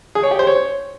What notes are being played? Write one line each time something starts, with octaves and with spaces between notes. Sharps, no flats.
G#4
C#5
G4
C5
C#5